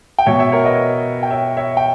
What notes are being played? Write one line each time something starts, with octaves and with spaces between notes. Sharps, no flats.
G5
B2 C#5 E5
C#5 E5
A#4 C#5
B4 D#5
G5
C#5 E5
C#5 E5
G5